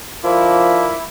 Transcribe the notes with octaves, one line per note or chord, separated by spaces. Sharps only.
D3 F3 E4 A#4 D6